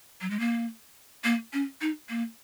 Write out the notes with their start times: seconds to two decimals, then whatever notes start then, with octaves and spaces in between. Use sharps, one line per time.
0.21 F#3
0.30 G#3
0.40 A#3
1.24 A#3
1.53 C#4
1.81 D#4
2.09 A#3